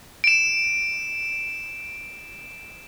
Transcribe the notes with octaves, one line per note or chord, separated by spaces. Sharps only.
D7 E7